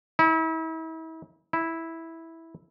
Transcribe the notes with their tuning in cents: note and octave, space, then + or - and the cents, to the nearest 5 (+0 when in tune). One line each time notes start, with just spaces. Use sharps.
E4 -40
E4 -10